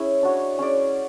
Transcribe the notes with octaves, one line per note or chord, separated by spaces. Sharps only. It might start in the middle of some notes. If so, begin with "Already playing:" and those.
Already playing: C#4 E4 G#4
D4 F#4 C#5
C#4 G#4 D5